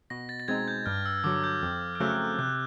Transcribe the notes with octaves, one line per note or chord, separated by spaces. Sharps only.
B2 A#6
A6
A6
G#3 C4 D#4 G#6
G6
G2 F6
E6
D3 F#3 D6
G6
F2
F6
C#3 F#3 A3 C4 F#6
C3 F#6